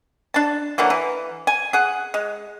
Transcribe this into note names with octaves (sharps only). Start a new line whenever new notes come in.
D4 A5
D3 E3 F#3 A#3
E3
G#5
G#4 F#5
G#3